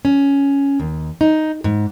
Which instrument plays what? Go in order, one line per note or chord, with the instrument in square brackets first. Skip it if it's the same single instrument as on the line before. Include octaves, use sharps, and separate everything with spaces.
[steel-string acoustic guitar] C#4
D#2
D#4
G#2